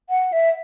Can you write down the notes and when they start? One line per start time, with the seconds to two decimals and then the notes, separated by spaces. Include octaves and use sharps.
0.10 F#5
0.32 E5